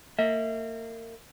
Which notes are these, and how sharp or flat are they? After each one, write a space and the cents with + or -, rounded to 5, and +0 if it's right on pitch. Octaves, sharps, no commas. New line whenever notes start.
A#3 -35 E5 -35